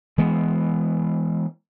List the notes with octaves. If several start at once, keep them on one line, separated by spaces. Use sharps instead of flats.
E3 G#3 B3